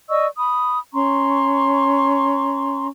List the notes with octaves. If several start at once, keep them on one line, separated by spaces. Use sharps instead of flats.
D5 D#5 C#6 E6
B5 D#6
C#4 A#5 C6 C#6